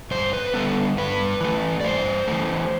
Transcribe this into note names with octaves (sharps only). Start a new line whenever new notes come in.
G2 C5
B4
D3 G3 B3 A4
G2 B4
E3 A3
D5
G2 C5
E3 A3